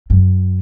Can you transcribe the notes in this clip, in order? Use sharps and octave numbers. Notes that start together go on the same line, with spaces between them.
F#2